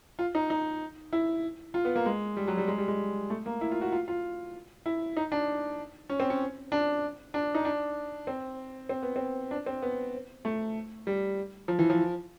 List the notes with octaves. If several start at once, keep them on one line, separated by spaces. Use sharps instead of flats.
F4
D#4
D#4
E4
F4
B3
A#3
G#3
G3
F#3
G3
G#3
G3
G#3
A3
A#3
E4
F4
F#4
F4
F4
E4
D#4
D4
C#4
C4
C#4
D4
D4
D#4
D4
C4
C4
B3
C4
D4
C4
B3
A3
G3
F3
E3
F3